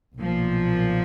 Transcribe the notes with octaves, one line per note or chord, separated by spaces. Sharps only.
B1 A#2 F3